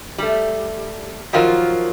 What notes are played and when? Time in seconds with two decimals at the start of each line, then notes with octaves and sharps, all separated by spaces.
0.18 G3 A3
1.33 D#3 F3 F#3 F4 A#4